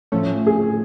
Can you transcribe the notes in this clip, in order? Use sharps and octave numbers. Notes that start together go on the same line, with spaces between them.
A2 F3 A3 C#4
G#4